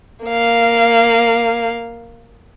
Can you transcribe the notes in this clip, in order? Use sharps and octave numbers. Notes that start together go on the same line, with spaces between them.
A#3 F5